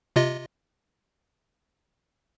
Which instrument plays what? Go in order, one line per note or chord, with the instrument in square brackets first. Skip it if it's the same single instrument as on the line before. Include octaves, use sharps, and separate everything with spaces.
[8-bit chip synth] C3 F4 D#5